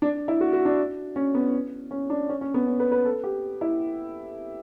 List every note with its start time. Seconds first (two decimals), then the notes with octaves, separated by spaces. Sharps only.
0.02 D4
0.28 E4
0.41 F#4
0.53 F#4
0.65 D4
1.16 C#4
1.35 B3
1.91 C#4
2.10 D4
2.29 C#4
2.41 C#4
2.54 B3
2.67 C#4
2.80 B4
2.92 B4
3.05 A4
3.23 G4
3.61 E4